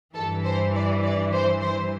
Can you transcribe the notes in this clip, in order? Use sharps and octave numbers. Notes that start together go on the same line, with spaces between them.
G2 E3 A4
C5
D5
D5
C5
C5